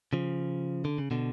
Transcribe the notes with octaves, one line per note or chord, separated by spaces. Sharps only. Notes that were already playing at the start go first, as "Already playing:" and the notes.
C#3 F3
D3
C#3
B2 D3